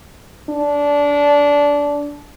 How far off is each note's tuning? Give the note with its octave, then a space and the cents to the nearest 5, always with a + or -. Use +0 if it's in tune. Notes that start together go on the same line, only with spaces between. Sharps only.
D4 -20